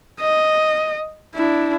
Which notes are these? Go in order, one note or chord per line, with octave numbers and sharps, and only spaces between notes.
D#5
D4 E4